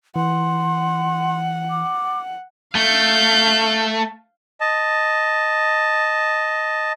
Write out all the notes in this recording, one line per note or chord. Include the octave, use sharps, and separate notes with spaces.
E3 F#5 C6
D6
A3 F5 G6
D#5 A5